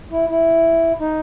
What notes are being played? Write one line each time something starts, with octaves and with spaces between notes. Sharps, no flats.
E4
E4
D#4